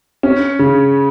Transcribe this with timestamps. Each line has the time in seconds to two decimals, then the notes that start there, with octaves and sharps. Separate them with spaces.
0.23 C#4
0.59 C#3